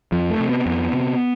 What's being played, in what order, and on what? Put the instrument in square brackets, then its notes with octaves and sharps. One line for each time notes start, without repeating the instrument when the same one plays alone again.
[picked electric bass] F2 F3
A3
C3
B3
F2 B3
C3